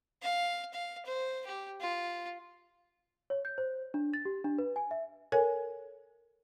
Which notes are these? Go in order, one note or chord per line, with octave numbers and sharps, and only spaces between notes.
F5
F5
C5
G4
F4
C#5
G6
C5
D4
A6
G4
D4
B4
G#5
E5
A4 A#4 C#5 G#5